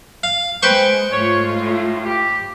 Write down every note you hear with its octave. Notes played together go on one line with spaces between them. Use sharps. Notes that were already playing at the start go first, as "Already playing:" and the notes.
F5
G#3 B4 C5 G5 C#6
G#2 A3 F4 C#5
A2
G4